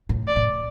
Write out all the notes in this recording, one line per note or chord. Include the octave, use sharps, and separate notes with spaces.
A2
D5
A2